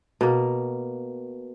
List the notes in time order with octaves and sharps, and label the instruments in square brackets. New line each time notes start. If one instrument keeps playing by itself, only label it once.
[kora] B2 A#3